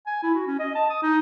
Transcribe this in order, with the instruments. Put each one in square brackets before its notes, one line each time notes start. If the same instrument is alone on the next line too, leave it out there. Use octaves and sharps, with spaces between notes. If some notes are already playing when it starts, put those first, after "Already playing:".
[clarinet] G#5
E4
F#4
C#4
D#5
A5
D#6
D#4